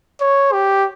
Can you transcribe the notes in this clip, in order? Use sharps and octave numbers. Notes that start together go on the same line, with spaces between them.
C#5
G4